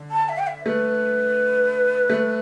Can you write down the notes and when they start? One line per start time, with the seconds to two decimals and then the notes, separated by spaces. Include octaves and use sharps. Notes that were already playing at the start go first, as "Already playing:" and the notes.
Already playing: D3
0.11 A5
0.29 E5
0.38 G5
0.47 E5
0.65 A3 B4
2.10 A3